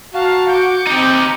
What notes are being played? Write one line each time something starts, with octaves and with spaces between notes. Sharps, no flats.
F#4 F5 A5 A#5
D6 G6 C#7
C4 D#4 G4